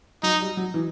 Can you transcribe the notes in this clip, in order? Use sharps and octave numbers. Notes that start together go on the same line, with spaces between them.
F#3 D#4
G3
F#3
E3